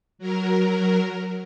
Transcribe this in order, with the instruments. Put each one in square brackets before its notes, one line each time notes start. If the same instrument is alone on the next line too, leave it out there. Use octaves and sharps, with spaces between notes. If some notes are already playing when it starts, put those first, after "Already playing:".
[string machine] F#3 A#4